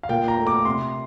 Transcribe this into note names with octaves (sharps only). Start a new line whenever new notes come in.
F5
A#2 G5
A#5
A3
D6
C3 C6